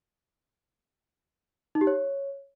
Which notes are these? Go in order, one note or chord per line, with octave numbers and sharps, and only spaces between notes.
D#4
G4
C#5